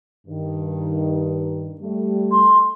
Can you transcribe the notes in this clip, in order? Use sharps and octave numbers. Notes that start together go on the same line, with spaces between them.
G2 D#3
G3 A3
C6